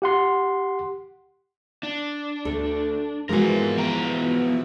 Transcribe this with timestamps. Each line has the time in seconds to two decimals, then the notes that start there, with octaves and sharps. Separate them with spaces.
0.02 G4 F#5 C6
1.83 D4
2.45 D2 A4
3.29 B2 E3 F3 G#3 F#4 A#4 G#5
3.78 B3 G5 A#5